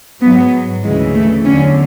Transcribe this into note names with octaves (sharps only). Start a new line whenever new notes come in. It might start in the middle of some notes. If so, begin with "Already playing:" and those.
G#2 F#3 B3
D2 C#3 E3 G#3
A3
E2 D3 F#3 C#4